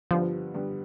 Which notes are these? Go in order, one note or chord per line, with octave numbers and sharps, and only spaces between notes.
G2 D3 F3 G3 B3
G2 D3 G3 B3